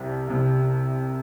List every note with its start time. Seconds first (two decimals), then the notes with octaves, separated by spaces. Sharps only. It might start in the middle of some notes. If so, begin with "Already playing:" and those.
Already playing: C2 C3 G3
0.28 C2 C3 G3